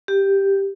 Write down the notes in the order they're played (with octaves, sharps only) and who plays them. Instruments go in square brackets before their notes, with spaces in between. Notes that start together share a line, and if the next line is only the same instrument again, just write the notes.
[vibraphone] G4